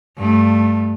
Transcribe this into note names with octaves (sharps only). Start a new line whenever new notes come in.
G2 A3